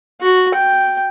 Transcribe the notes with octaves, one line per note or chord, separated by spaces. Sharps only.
F#4
G5